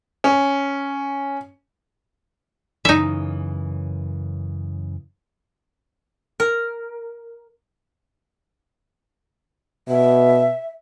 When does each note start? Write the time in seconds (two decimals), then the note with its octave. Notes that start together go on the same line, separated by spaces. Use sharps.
0.24 C#4
2.85 F#2 C#3 E3 D#4 E5
6.40 A#4
9.89 B2 E5